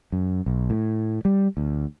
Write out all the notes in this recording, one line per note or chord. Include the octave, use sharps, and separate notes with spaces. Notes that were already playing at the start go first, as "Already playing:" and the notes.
F#2
B1
A2
G3
D2